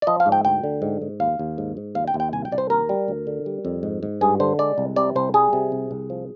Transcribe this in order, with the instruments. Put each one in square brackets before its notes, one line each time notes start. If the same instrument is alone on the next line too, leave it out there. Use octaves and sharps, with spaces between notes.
[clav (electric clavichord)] D5
F3 D#5
F5
G#2
G5
D2 G5
D3
G#2
G#2
D#2 F5
D#2
G#2
G#2
D#2 F5
G5
D#2
G5
C2 G#5
G5
C2 D5
C5
D#2 A#4
G3
D2
D3
G3
F2
G#2
G#2
G2 G#4
D3 C5
G#3 D5
C2
C3 D5
C2 C5
G3 G#4
C3
C2
C2
F3